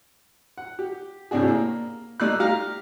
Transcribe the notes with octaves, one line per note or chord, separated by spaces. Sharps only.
F#5
G4
A2 C3 D4 F#4 G#4
A#3
G3 A3 D#4 D5 E6 F#6
G4 F5 A#5